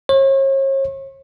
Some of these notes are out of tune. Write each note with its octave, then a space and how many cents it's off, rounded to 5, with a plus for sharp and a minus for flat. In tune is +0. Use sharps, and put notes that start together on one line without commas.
C#5 -40